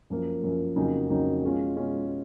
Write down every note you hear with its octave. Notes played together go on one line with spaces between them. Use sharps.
F#2 F3 A#3
F#2 F3 A#3
F2 C#3 F#3 A#3 D#4
F2 C#3 F#3 A#3 D#4
B2 G#3 C#4 F4
B2 G#3 C#4 F4